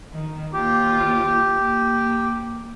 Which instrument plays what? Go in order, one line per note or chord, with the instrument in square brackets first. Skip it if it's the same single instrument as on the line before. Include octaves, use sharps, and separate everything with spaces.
[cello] D#3
[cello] D#2 F4 [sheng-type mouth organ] G4
[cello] A#3